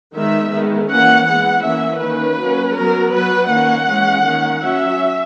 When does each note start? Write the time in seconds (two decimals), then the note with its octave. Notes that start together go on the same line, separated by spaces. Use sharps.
0.14 D#3 G#3 B3 E5
0.51 D#3 G#3 B3
0.89 E3 A#3 C#4 F#5
1.26 E3 G#3 B3 F#5
1.64 E3 A#3 C#4 E5
2.01 D#3 A#3 C#4 B4
2.38 F#3 A#3 C#4
2.75 F#3 B3 A#4
3.12 F#3 B3 B4
3.51 D#3 A#3 C#4 F#5
3.88 E3 G#3 C#4
4.25 D#3 A#3 C#4
4.63 F#3 C#4 E5